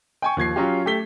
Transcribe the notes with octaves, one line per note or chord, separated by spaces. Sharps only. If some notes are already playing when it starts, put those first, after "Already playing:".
G5 G#5 C#6
D#2 F3 G#6 C7
F#3 C#4 F4 G4
A3 G4 A4 B6 G7